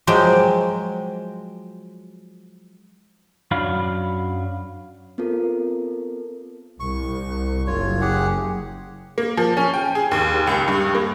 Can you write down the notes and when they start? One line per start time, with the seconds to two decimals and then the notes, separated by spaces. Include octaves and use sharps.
0.07 F3 F#3 G#3 G5
3.51 F#2 F#3 D4 F5 B5
5.18 B3 C4 F4 A4 A#4
6.80 C2 C#6
7.67 F#1 F4 C#5
8.01 G4 G#4 F#5
9.18 A#3
9.37 F3
9.57 C#4
9.74 G5
9.95 G#4
10.11 D#2
10.47 C#2
10.68 G2
10.95 A#3